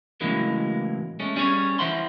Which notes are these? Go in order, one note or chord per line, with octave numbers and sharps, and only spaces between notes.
A2 C#3 E3 F#3 G#3 A#3
G#3 A3 C#4
G3 C#4 G#4 C#5
E3 C5 E5 F#5 C6